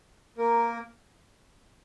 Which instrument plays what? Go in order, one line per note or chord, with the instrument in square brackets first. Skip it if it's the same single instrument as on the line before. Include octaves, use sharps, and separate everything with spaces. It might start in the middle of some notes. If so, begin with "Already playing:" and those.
[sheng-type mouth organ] A#3 A#4